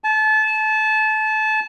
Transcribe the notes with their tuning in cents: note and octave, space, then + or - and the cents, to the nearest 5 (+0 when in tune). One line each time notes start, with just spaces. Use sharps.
A5 -25